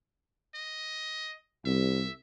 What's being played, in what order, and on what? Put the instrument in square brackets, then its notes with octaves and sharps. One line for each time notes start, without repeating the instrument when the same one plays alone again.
[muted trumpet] D#5
[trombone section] C2 [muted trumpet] E5